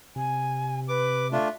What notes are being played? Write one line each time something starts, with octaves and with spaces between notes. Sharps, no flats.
C3 G#5
B4 D6
A3 D4 F4 E5